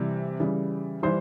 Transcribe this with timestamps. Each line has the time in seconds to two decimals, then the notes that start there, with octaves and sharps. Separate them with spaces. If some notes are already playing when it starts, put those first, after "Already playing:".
Already playing: C3 E3 G3
0.40 C#3 E3 G3
1.03 E3 G3 C5 C6